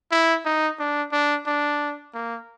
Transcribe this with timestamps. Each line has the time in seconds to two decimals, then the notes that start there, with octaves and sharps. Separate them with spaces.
0.11 E4
0.45 D#4
0.79 D4
1.12 D4
1.46 D4
2.14 A#3